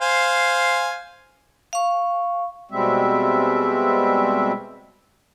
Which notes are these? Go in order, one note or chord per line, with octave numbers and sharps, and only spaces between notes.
C5 F5 G#5
F5 C#6
B2 G3 G#3 C4 E5